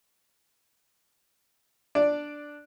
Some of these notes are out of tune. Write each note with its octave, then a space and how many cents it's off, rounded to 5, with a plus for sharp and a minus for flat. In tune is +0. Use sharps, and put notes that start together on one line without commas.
D4 +0 D5 +0